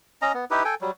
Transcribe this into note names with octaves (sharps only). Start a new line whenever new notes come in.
C#4 D#5 A#5
B3
D#4 E4 G4 B4
A4 G5 G#5
F#3 G3